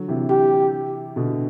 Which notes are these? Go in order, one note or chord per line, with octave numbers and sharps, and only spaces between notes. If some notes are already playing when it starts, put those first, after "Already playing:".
Already playing: D3 F#3
C3 E3
G4
B2 D3